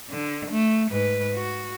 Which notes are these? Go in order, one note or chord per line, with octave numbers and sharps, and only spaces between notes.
D3
A3
G#2 B4
F#4